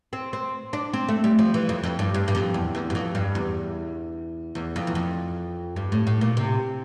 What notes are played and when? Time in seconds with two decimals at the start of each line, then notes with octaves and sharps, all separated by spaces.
0.13 C4
0.33 C4
0.73 D4
0.93 C4
1.09 A3
1.24 G3
1.39 F3
1.54 E3
1.69 F2
1.84 F2
1.99 G2
2.14 G2
2.28 G2
2.35 F2
2.54 E2
2.75 E2
2.90 G2
2.95 F2
3.15 G2
3.35 E2
4.55 E2
4.76 F2
4.87 E2
4.95 F2
5.76 G2
5.92 A2
6.07 A2
6.21 A#2
6.37 C3